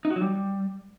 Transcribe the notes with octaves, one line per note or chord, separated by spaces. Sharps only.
D#4
F#4
F#3
G3